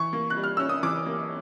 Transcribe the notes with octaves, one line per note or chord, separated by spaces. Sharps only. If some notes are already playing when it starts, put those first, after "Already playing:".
Already playing: E3 C#6
A#3
F#6
G3
F6
C#4 E6
D#6
E3 D6
A#3